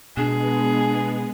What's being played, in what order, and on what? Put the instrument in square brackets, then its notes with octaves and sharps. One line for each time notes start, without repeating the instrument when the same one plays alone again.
[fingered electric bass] B2 [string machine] G#3 B3 [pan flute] D4 [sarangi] G#4